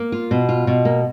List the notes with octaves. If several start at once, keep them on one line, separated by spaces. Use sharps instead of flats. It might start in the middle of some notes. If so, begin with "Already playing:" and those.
Already playing: A#3
F4
B2
F4
B2
A#3